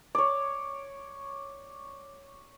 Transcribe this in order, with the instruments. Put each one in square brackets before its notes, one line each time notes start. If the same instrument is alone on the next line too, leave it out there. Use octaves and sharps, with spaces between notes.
[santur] C#5 D5